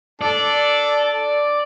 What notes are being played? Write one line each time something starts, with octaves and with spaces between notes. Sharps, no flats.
D4 A4 D5